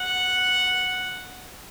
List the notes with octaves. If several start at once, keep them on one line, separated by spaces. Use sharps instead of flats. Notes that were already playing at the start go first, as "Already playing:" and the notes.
Already playing: F#5